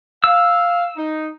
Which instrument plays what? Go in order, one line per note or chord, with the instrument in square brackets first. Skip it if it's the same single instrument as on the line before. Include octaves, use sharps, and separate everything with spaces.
[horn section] F5 [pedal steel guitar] E6
[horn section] D#4